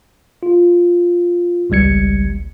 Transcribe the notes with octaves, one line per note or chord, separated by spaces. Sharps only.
F4
G#1 C#2 G3 G#6 C#7